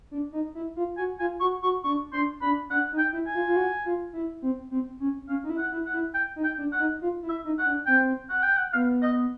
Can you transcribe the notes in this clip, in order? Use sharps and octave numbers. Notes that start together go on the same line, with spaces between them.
D4
D#4
E4
F4
F#4 G#5
F4 G#5
F#4 C#6
F#4 C#6
D4 C#6
D4 C6
D4 B5
D4 F#5
D#4
G5
E4
G#5
F4
F4
F#4
F4
E4
C4
C4
C#4
C#4 F5
D#4
E4
F#5
E4
F#5
E4
G5
D#4
G5
D4
F#5
D#4
F4
E4
E5
D#4
F#5
D4
C4 G5
F#5
G5
F#5
B3 F5
D#5